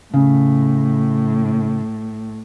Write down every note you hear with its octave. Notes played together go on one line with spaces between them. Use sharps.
A2 C#3